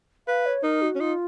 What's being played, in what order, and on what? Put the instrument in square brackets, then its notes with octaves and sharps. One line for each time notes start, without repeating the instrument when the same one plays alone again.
[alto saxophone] B4 [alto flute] F5
[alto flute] C#5
[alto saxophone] D#4 [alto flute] A#4
[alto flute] F#4
[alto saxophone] C#4
[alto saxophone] D#4 [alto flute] F4